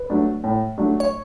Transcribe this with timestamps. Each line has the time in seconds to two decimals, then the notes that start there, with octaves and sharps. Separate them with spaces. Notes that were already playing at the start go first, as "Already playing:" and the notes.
Already playing: B4
0.10 F#3 A3 D4
0.44 A2
0.78 F#3 A3 D4
1.00 C#5